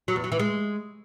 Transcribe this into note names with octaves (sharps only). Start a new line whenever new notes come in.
F#3
E2
F#3
E3
G#3